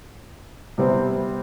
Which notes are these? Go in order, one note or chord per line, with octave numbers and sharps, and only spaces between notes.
C3 G3 B3 C4